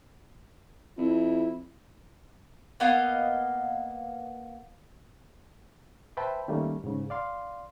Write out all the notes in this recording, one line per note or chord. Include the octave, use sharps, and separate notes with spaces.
F2 E4
A#3 B3 D#5 F5
B4 C5 E5 G5 A5 B5
D#3 G3 A3 A#3 C#4
G#2 C#3
D5 F5 C6